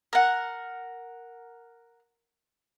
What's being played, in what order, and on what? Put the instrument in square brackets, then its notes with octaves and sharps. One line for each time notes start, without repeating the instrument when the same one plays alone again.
[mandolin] A#4 F#5